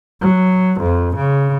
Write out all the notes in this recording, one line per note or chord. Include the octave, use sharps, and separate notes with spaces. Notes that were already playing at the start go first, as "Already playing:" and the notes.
F#3
F2
C#3